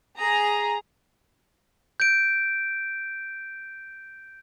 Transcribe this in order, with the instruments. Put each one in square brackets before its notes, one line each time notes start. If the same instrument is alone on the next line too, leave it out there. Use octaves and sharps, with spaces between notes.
[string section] G#4 A#5
[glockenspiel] G6 D7